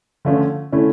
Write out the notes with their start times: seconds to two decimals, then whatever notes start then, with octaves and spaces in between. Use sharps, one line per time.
0.25 D3 F3 A3 C#4
0.72 D3 A3 C#4 E4